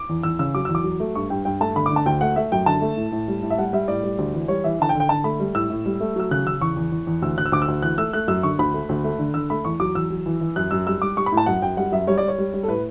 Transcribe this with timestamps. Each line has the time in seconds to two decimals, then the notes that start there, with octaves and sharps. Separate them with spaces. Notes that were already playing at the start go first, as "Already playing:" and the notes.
Already playing: D6
0.09 E2
0.23 E2 E6
0.39 C#3 E6
0.55 F#3 D6
0.65 E2 E6
0.75 D6
0.84 F#3
1.00 A3
1.15 G2 C#6
1.30 G2 G5
1.45 G2 G5
1.60 A3 A5
1.75 D3 B5
1.86 D3 D6
1.96 A5
2.06 D2 G5
2.21 A3 F#5
2.36 A3 E5
2.52 F#2 G5
2.66 D3 A5
2.82 A3
2.97 A2
3.12 A2
3.28 G3
3.43 A2
3.50 E5
3.58 G3 F#5
3.73 G3 E5
3.88 A2 D5
4.03 G3
4.18 D2
4.34 E3
4.48 G3 C#5
4.64 E3 E5
4.80 D3 A5
4.89 G5
4.95 D3
5.00 G5
5.09 D3 A5
5.24 A3 B5
5.40 G3
5.55 A2 E6
5.70 A2
5.86 G3
6.00 A3
6.16 F#3 E6
6.31 C#3 F#6
6.46 C#3 E6
6.61 E2 C#6
6.76 E2
6.92 E2
7.07 E2
7.22 D2 E6
7.38 D2 F#6
7.46 E6
7.52 D2 D6
7.62 E6
7.68 D2
7.82 E3 F#6
7.97 A3 E6
8.13 A3 F#6
8.28 F#2 E6
8.43 D3 C#6
8.59 D2 B5
8.74 A3
8.89 D2
9.04 A3
9.19 D3
9.34 D3 E6
9.50 A3 B5
9.65 E2 C#6
9.80 F#3 D6
9.95 E2 E6
10.10 F#3
10.26 E3
10.41 E3
10.56 F#2 F#6
10.71 F#2 E6
10.87 G3 E6
11.02 G3 D6
11.17 G3 C#6
11.26 B5
11.32 A2
11.37 A5
11.46 F#2 F#5
11.62 F#2 G5
11.77 G3 F#5
11.92 F#2 E5
12.07 G3 C#5
12.18 D5
12.23 G3
12.28 C#5
12.38 G3
12.54 G3
12.63 A4
12.68 A2 B4